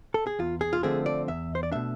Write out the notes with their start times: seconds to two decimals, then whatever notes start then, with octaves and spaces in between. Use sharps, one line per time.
0.14 A4
0.27 G#4
0.39 E2 F4
0.61 G#4
0.73 F4
0.83 D3 F3 A3 C4 G#4
1.06 D5
1.28 E2 E5
1.55 C5
1.63 D5
1.71 B2 A3 D4 E5